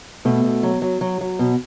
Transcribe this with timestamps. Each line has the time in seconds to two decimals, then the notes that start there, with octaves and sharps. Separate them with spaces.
0.25 B2 A3
0.44 B2
0.63 F#3
0.82 F#3
1.01 F#3
1.21 F#3
1.39 B2